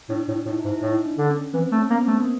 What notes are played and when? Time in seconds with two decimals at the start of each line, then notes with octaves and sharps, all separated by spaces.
0.10 A2 D4
0.28 A2
0.46 A2
0.48 D#4
0.58 E4
0.65 G#2
0.71 E4
0.82 A2 D#4
1.06 D4
1.18 D3
1.30 C#4
1.54 E3 C4
1.72 A3
1.78 C#4
1.90 A#3 B3
2.02 C4
2.08 A3
2.20 A#3